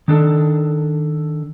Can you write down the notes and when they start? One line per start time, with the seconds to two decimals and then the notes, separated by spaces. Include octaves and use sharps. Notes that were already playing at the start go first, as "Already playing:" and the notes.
0.08 D#3 D4 A4